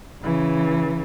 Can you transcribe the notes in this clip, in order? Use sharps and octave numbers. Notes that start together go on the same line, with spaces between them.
C#3 E3